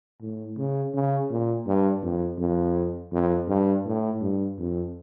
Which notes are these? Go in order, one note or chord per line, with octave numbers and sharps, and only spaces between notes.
A2
C#3
C#3
A#2
G2
F2
F2
F2
G2
A2
G2
F2